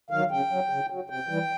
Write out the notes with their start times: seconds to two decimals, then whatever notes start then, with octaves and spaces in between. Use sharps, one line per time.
0.10 D#3 F#3 F5
0.31 C#3 G5
0.50 F#3
0.70 C#3
0.90 F#3
1.10 C3 G5
1.28 E3 G3